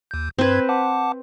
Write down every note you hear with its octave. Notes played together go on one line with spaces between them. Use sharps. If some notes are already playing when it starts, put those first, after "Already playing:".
D#2 G6
G2 C4 B4 G#6
F#5 A5 D6